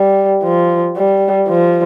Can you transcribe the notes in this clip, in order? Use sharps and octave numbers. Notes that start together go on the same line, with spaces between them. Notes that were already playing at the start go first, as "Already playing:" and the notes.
Already playing: G3
F3
G3
F3